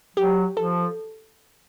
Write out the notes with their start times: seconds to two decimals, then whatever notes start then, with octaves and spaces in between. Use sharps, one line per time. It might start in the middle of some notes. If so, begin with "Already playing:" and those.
0.17 F#3 G4
0.57 F3 A4